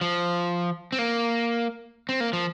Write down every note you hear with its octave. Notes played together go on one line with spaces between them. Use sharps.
F3
C4
A#3
C4
A#3
F3